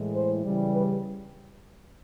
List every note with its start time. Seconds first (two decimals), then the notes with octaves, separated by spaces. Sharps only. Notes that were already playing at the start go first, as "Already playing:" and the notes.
Already playing: A2 E3 G#3
0.14 C5
0.43 C#3 E3 G3
0.72 B4